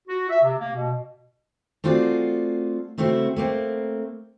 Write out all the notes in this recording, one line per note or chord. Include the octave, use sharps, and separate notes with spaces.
F#4
E5
C3
A#3
B2
A3 C4 F4 F#4 G#4 D5
C#3 A3 C4 E4 F#4
A3 A#3 C4